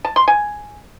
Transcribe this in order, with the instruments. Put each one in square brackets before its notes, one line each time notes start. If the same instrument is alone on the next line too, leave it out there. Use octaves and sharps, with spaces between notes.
[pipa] A5
C6
G#5